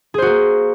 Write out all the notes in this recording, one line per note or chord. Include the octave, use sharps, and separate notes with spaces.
A#3 F#4 G#4 C5